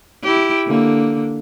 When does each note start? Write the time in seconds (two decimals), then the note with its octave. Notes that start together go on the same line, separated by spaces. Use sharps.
0.23 E4 G4
0.67 D3 A#3